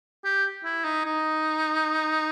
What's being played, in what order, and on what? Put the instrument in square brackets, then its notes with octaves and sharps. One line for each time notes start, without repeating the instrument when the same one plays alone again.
[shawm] G4
E4
D#4
D#4